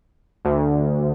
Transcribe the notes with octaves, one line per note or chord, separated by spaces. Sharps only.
D2